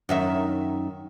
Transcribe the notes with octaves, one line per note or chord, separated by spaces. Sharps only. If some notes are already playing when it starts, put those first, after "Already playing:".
F#2 D#3 E5